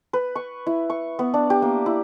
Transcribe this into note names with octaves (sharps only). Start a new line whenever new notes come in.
B4
C#6
E4
C#6
B3
D4
G4
A#3
E4